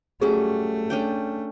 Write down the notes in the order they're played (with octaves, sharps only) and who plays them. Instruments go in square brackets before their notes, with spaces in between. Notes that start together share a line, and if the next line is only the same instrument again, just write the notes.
[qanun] F#3 G3 C#4 [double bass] A3 [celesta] G#4
[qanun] C#4 D4 G5